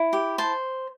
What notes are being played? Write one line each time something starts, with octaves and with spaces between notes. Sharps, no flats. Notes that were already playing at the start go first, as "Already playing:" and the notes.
Already playing: E4
G4
C5 A5